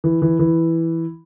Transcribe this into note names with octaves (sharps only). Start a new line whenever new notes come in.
E3
E3
E3